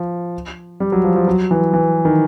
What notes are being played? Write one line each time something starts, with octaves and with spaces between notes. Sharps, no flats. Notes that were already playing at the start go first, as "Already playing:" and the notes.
Already playing: F3
G3
F#3
F3
F3
F#3
E3
E3
D#3